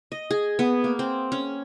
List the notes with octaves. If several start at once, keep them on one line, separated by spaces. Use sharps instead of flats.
D#5
G#4
B3
A#3
C4
C#4